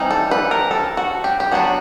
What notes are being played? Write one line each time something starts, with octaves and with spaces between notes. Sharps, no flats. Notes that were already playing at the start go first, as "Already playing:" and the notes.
Already playing: E3 G3 C4 D#4
A4
B4
A#4
A4
F#4
G4
G4
F#3 B3 D4 F#4